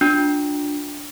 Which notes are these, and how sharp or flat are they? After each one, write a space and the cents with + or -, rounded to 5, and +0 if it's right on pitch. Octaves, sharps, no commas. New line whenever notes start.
D4 +0 F4 +40